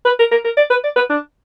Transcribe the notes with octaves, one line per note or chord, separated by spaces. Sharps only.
B4
A#4
A#4
A#4
D5
B4
D5
B4
D4